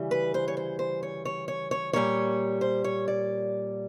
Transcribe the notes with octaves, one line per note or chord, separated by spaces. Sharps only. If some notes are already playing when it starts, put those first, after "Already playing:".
Already playing: D2 C#3 E3 G3
B4
C5
C#5
C5
C5
C#5
C#5
C#5
C#5
A#2 G3 A#3 C#5
C5
C#5
D5